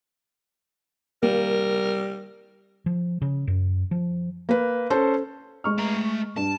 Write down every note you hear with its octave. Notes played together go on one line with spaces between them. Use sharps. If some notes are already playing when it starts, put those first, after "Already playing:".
G3 A#3 A#4
F3
C#3
F#2
F3
A#3 B4
C#4 A4 C5
G#3 C#6 F6
A3 A#5
G2 A5